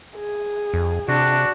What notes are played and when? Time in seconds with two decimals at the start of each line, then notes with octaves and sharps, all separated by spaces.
0.16 G#4
0.74 F2
1.08 C3 D4 F#4